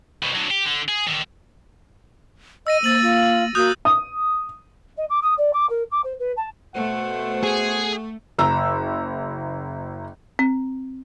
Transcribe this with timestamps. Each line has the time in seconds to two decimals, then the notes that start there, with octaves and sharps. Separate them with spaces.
0.23 C2 B2
0.35 D3 F#3
0.51 G4
0.66 D3
0.88 G#4
1.07 D3 D#3
2.67 D#5 E6 A#6 D#7
2.84 A#3 C5 E6 A6 F#7
3.02 F4
3.55 A#3 F#4 D#6 F#6 G6
3.85 D#6
4.97 D#5
5.09 D6
5.22 D#6
5.37 D5
5.53 D6
5.69 A#4
5.91 D6
6.04 C5
6.19 B4
6.36 A5
6.75 B2 A3 C5 F#5
7.43 G#4
8.38 F#1 A#5 E6
10.39 C4